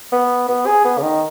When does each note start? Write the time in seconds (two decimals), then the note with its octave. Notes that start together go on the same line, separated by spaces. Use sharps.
0.12 B3
0.48 B3
0.66 G#4
0.84 B3
0.98 C#3
1.02 D#3